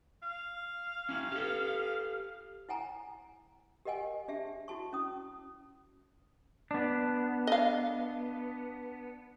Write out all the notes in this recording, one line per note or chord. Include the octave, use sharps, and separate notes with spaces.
F5
C#4 E4
G4 A4
E4 F#5 G#5 A#5
G4 A#4 D#5 F#5 G#5
D4 G4 G#4 E5 A5
E4 F#4 A5 C#6
C#4 E4 D#6
B3 D4
D#5 F5